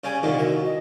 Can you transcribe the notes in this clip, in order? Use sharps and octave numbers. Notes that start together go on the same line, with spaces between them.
C#3 G3 G#5
C2 A#2 D3 D#3
F#4 E5
D#5